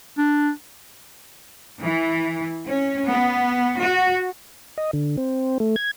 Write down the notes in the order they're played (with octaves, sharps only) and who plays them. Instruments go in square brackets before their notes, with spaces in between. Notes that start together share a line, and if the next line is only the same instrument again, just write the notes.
[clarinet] D4
[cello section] E3
C#4
B3
F#4
[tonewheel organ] D#5
D3
C4
A3
G#6